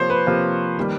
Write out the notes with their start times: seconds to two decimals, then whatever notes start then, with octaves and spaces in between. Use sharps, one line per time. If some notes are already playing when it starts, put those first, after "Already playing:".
Already playing: C3 F3 A#3 C5 C#5
0.10 B4
0.27 C3 F3 A#3
0.78 D#3 G3 A#3